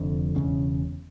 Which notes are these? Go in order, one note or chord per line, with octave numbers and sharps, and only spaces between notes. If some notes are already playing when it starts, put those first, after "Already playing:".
Already playing: F1 F2 D3
E1 E2 C#3 C#4